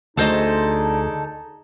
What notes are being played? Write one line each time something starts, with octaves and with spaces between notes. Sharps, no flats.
D2 A3 D4 D#4 G#4 A4 C5 D#5